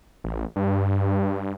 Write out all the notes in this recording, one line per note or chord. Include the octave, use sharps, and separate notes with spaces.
A1
G2